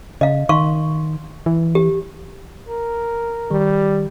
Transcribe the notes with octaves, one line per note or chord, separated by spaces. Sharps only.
C#3 D#5 F5
D#3 F5 C6 C#6
E3
G4
A#4
D#3 G3